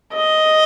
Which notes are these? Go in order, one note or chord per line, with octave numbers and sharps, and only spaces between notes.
D#5